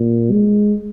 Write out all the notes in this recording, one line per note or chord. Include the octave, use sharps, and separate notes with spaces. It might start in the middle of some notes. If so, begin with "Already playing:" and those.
Already playing: A#2
G#3